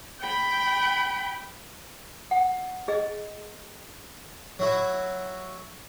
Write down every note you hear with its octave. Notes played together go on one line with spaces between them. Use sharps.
G5 B5
F#5
G#4 D#5
F#3 E4 F#4